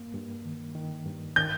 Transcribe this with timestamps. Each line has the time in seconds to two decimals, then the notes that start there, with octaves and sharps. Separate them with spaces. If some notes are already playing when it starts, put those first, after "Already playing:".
Already playing: G2 A#3
0.14 G2
0.45 D#3
0.75 D#3
1.05 G2
1.36 D#3 G6